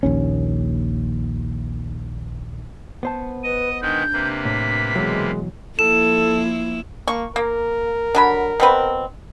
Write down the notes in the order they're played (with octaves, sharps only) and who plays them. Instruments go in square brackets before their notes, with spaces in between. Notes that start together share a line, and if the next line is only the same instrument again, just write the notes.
[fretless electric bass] A#1 D#2 C#4
[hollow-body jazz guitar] B3 C5 A5
[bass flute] B4 [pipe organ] D#5 [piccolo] D#7
[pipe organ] D#3 G#3 B4 [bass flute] D4 [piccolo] G6
[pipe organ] C3 A#3 B4
[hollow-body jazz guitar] A2 [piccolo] B6
[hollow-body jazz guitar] B2 E3 F#3 [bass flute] G#3
[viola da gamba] F3 A#3 E4 [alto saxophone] A4 [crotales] E7
[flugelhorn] A#3 [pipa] C#6
[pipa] A#3 [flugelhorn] A#4
[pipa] D3 F#3 B5
B2 C4 B4